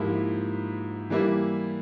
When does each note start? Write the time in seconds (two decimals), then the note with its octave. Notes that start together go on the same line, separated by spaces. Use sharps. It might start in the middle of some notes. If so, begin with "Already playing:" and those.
Already playing: G#2 F3 A#3 E4 G4
1.10 E3 G3 A#3 E4 G4